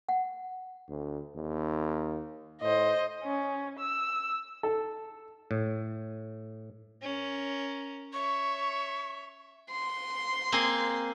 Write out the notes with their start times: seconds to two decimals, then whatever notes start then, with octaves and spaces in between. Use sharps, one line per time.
0.09 F#5
0.89 D2
1.36 D#2
2.62 A2 C5 D#5
3.23 C#4
3.79 E6
4.63 A4
5.51 A2
7.02 C#4 A#4
8.13 C#5 E5 C#6
9.71 C6
10.52 A#3 C4 G#4